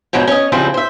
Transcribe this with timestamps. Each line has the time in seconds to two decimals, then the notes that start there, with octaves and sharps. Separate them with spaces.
0.13 G#2 B2 F3 F#3 C5
0.27 C#4 D#5
0.52 C#3 F3 G3 C4 E4 C5
0.74 C5 E5